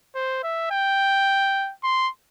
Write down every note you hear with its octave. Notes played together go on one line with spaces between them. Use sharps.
C5
E5
G5
C6